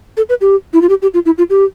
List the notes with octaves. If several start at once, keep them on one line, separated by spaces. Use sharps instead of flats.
A4
B4
G4
E4
F4
G4
G4
F4
E4
F4
G4